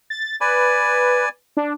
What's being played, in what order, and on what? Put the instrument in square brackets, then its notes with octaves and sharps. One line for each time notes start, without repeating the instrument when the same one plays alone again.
[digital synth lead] A6
[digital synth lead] B4 [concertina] D5 G#5
[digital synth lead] D4